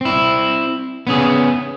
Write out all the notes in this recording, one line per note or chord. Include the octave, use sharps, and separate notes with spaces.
C4 E4
B3 C#4 G#4